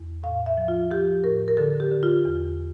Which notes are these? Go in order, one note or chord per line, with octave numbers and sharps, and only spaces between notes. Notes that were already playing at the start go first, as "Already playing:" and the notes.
Already playing: E2
A2 F5
E5
F3
F4
F3 G4
A2 A#4
A#4
D3 A4
G4
D3
F4
E2